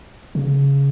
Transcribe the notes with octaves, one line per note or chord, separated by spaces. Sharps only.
C#3